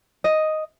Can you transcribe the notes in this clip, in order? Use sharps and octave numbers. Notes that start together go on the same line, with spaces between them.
D#5